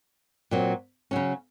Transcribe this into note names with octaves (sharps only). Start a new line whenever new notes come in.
A#2 F#3 C4
C#3 F#3 C#4